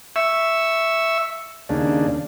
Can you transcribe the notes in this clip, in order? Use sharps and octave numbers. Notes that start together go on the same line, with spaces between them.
E5 C#6 E6
D#2 C#3 D4